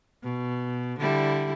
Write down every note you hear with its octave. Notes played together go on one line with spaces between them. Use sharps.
B2
D3 G3 E4